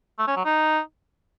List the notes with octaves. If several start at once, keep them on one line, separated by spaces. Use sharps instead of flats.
A3
C#4
F#3
D#4